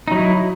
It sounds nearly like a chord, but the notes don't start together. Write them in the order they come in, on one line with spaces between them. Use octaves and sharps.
D#4 F#3 E4